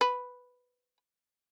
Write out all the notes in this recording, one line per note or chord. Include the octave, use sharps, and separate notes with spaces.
B4